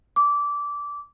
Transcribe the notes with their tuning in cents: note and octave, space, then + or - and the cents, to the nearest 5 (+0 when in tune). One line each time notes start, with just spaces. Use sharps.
D6 -15